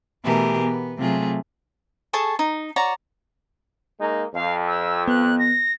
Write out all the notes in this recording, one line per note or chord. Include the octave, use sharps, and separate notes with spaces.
B2 E3 A3 G4 G#4 A#4
B3
C3 F#3 A3 F4 G#4
G#4 A4 A5 C#6
D#4
F#4 C#5 D5 A#5
G#3 A#3 D#4
F2 F5
E6
B3 F#6
A#6